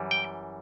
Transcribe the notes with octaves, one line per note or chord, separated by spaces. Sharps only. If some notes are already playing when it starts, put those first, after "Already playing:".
Already playing: F#2 E3 G3
G5